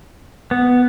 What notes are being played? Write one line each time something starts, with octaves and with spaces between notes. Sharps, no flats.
B3